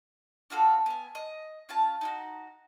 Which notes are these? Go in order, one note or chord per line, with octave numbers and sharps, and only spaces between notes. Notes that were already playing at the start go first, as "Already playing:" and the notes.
D4 F4 F#4 A4
B3 G#5
D#5
C#4 F4 A5
D#4 E4 F#4